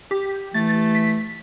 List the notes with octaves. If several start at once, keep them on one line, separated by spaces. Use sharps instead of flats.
G4
E3 A3 A6
B6